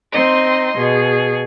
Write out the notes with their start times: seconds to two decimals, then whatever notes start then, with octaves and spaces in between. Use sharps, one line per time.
0.13 C4 D#4 D#5 C6
0.76 B2 G#4